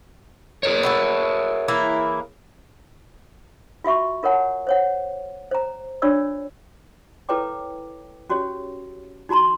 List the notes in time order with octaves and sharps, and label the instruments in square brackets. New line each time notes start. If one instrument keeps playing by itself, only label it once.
[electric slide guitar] G#4 A#4 C#5
[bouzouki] E4 F#4 A4
E3 A#3 E4
[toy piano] F4 F#4 E5 C#6
F4 A#4 C#5 F#5 A5
C5 C#5 F#5
C5 A#5
D4 F4 C#5 D5 E6
E4 A4 B4 C#5 G5 D6
C#4 F#4 G4 C#5
D#4 F#4 A5 A#5 C6